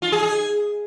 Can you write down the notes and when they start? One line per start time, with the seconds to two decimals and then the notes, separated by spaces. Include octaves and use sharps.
0.02 F4
0.12 G#4
0.23 G#4